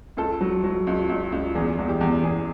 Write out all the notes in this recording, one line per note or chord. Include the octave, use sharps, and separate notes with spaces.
C#2 A4
F#3
F#3
C#2
C#2
C#2
E2 G#4
E2
G4
E2
E2 G#4